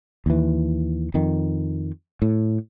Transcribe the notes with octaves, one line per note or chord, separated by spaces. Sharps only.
D#2 E3
F2 D#3
A2